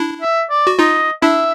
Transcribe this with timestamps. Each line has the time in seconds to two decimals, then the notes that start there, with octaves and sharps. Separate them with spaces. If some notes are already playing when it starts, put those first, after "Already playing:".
Already playing: D4 E4
0.22 E5
0.50 D5
0.67 F#4
0.79 D#4 F4 D#5
1.22 D4 E4 E5